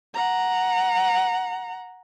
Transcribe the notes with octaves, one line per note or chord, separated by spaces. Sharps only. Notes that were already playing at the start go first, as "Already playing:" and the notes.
F#5 A#5